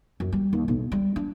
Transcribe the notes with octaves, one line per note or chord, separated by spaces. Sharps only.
F#2
G3
D#2
B1
G3
D4